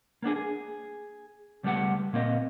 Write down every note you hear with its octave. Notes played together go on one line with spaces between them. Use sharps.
A#3 B3 D4 G#4
G#4
C#2 G3 A3 B3 G4 F#5
A#2 A#3 C4 D#5